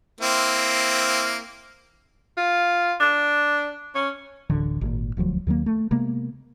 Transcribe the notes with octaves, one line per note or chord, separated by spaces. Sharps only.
A#3 C4 E4
F4
D4
C#4
D1 A1 D3
G#1 A#2
D#1 D2 F3 F#3
D#2 D#3 F#3 A#3
A3
C3 G#3 A#3 B3